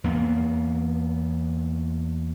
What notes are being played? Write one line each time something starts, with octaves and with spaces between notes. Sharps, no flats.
E2 A#3 B3